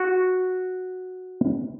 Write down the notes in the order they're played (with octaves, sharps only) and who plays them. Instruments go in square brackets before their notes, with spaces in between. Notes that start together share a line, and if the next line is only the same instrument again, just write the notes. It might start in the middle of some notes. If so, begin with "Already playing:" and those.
Already playing: [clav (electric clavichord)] F#4